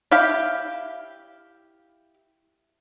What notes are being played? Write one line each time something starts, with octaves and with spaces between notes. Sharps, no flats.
E4 G4 F5 G5